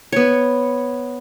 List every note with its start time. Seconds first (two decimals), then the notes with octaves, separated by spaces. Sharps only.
0.12 B3 C#5